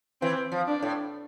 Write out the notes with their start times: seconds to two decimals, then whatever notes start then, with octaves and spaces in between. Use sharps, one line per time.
0.22 E3 C4
0.52 F3
0.67 D4
0.83 A2